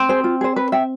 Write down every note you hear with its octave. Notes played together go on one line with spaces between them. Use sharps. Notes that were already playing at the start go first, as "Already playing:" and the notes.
Already playing: C4
G#4 C5
F4
G#4 C5
B4
E5 G5